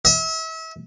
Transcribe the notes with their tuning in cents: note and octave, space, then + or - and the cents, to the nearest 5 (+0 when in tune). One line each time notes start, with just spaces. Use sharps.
E5 -35